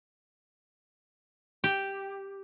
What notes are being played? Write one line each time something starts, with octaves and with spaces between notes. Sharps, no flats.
G4